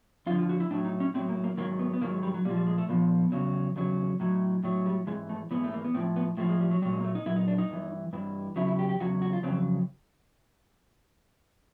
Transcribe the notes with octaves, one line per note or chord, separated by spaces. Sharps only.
F2 D3 F3 F4
F4
F#4
E4
A2 F#3 D4
D#4
C#4
A2 F#3 C4
A#3
A#3
G#2 D#3 F#3 A#3
B3
B3
G#2 D#3 F#3 A#3
G#3
G3
F#3
A#2 F3 G3
G3
G#3
A3
A#2 F3 B3
E2 C#3 F#3
E2 C#3 F#3
A2 F#3
A2 F#3
G3
G#2 E3 G#3
A3
G#2 E3 B3
A3
A#3
B3
A2 F3 C4
B3
A2 F3 A3
G#3
G3
F#3
A#2 F#3 G3
G#3
A#3
A3
D#4
A#2 F#3 E4
D#4
D4
D#4
G2 E3
G2 E3
E2 C#3 F#3 E4
E4
G4
G4
E2 C#3 F#3 F#4
F#4
F4
F2 C#3 F#3 C4